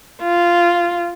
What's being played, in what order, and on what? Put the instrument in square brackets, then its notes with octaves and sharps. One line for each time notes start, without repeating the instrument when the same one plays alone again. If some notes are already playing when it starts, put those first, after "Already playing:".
[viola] F4